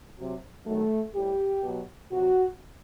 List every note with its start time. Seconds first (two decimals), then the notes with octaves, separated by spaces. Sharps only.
0.18 C3 F#3
0.66 C3 D#3 F#3 A3
1.14 A2 G3 G4
1.63 B2 F#3
2.12 C3 F#3 F#4